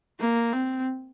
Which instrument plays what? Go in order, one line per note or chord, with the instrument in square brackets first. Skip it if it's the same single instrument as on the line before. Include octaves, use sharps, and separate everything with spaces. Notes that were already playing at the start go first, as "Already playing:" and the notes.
[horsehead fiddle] A#3
C4